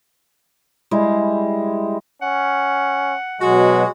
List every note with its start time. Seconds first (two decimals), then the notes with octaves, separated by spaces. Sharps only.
0.91 G3 G#3 E4
2.22 C#4 F#5
3.41 B2 F#3 G#3 F#4